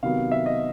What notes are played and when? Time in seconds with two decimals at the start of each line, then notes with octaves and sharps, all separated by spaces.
0.03 C3 D#3 F#3 B3 F5
0.31 E5
0.46 D#5